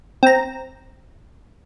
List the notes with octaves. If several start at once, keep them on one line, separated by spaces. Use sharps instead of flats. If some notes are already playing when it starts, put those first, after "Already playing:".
C4 A#5